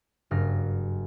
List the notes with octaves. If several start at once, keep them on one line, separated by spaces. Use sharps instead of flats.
F#1 G2 F6 A#6